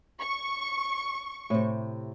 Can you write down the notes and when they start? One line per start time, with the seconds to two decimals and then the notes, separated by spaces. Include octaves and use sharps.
0.20 C#6
1.50 A2 C3